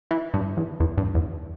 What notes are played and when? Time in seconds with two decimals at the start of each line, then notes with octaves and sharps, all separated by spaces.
0.11 E3
0.34 G2
0.57 E2
0.80 E2
0.98 G2
1.15 E2